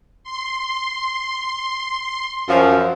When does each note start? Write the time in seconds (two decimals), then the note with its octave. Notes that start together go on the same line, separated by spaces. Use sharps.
0.24 C6
2.49 F#2 F3